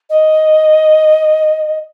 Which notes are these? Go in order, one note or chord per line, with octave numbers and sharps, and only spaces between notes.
D#5